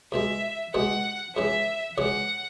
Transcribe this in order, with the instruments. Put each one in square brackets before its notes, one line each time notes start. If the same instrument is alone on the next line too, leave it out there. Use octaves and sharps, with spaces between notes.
[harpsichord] C#2 B2 G#3 [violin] E5
[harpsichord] C#2 B2 G#3 [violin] F#5
[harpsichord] C#2 C#3 E3 [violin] E5
[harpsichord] C#2 C#3 E3 [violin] F#5